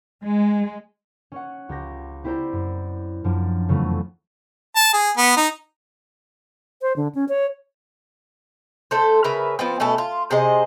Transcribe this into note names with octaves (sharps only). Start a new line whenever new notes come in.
G#3
C#4 C#5 F#5
C#2 G4 A#6
C4 E4 G4 C5 D5 A#5
F#2
F#2 F3 D4
F2 C#3 E3 F#3 A3 B3
A5
G#4
B3
D#4
C5
D3
C#4
C#5
A3 A4 C5
C#3 A#4 B4 E5
F3 B3 C4
B2 A3 C#4 A4
F4
C3 G#4 C5 D#5